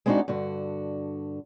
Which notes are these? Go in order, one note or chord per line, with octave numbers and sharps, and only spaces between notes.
G#3 B3 C4 D4 D#4 F#4
G2 D3 F#4